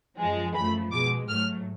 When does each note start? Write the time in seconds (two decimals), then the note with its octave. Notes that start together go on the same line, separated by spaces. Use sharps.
0.18 F#2 F3 G#3
0.55 F#2 F3 A3 B5
0.92 B2 G#3 D6
1.29 G#2 F#3 A3 F6